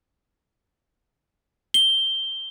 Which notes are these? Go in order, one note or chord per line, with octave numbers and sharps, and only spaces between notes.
G7